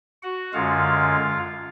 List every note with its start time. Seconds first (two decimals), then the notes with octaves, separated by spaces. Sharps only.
0.23 F#4 F#5
0.53 F#2 D3 G#3 F4 F5